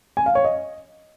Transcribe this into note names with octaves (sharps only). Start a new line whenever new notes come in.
G#5
F5
C#5
D#5